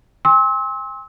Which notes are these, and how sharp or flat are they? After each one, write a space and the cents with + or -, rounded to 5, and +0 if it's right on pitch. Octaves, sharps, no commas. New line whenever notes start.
G#5 -45 C6 +30 E6 -35